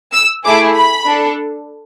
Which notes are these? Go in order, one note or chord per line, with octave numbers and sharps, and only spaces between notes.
E6
A3 E4 G#4 D6
B5
D4 A4